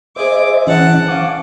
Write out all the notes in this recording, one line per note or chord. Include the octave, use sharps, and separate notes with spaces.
G#4 C5 D#5 E5 D6
E3 C#4 F#5 A5
C#4 F5 D6